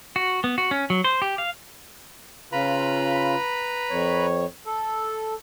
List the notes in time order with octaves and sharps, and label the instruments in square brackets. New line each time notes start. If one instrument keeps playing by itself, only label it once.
[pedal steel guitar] F#4
B3
F#4
C#4
F#3
C5
G4
F5
[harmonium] C#3 F4 [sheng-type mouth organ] B4 A#5 B5
[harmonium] F2 C#5
A4